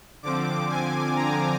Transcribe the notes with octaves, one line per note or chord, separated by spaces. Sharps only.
D3 F3 C4 D6
G#5
A#5